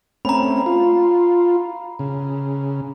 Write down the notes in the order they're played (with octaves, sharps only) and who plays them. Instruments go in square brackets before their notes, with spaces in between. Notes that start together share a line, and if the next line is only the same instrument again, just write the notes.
[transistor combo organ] A3 C4 C#4 [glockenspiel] A#5 B5
[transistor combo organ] F4
C#3